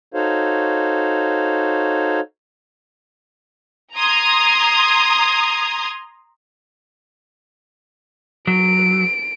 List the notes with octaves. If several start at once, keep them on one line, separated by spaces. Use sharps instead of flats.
D#4 F#4 A4 C5 C#5 F5
A#5 C6 D#6 G#6
F#3 D7